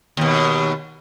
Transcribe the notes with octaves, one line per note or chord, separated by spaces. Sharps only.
D#2 B2